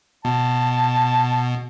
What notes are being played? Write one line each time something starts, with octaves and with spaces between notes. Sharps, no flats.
B2 A5